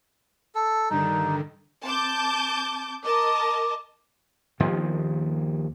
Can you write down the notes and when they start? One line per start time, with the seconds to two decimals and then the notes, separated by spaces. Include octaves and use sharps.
0.55 A4
0.90 G2 D3 D#3 D#4
1.84 C4 A5 D6 G6
3.03 A#4 D#5 A5 D6
4.60 D#2 D#3 F3